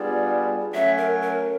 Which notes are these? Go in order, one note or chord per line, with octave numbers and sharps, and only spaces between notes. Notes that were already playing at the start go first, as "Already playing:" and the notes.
Already playing: G3 B3 D4 F4 G#4 D5
F#3 A3 C#4 E5
A#4
A#4